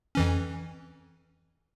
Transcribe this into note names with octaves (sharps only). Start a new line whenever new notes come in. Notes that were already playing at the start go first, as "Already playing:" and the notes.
F2 E3 C#4